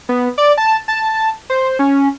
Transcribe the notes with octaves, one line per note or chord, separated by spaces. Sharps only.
B3
D5
A5
A5
C5
C#4